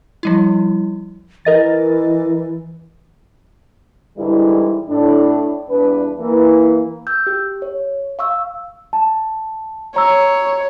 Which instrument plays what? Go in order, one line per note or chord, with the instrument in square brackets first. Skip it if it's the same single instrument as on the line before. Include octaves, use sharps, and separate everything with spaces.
[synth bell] F3 G3 E4
[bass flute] E3 [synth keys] A#4 D#5 A6
[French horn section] G#2 D3 E3 G3 E4
A2 D4
E2 G2 D4 B4
E3 A#3
[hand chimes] E6 G6
G4
C#5
F5 C#6 E6
[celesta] A5
[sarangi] C#5 [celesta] A#5 E6